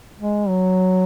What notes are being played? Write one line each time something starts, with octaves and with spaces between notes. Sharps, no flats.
G#3
F#3